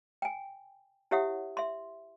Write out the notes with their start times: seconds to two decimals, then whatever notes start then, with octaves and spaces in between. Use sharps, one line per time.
0.22 G5 G#5
1.11 E4 G4 C#5 E5 F#5 D#6
1.57 E5 C6